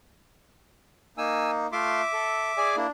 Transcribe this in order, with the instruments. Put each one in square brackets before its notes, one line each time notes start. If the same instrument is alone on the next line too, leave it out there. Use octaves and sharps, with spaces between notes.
[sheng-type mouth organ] A#3 D#4 [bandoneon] G#5 E6
[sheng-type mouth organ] A3 F4 C6 [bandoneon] E5 D6
[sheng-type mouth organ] A4
G#4 D5 G#5
[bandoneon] A#3 E4 [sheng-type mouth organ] D4